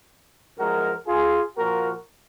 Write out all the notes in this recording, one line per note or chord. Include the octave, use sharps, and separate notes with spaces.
F#2 F3 G#3 F#4 A#4
F4 G#4
A#2 F3 A#3 F#4 A#4